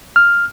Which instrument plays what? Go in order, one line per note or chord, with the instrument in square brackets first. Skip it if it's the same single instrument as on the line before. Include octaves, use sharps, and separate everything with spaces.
[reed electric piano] F6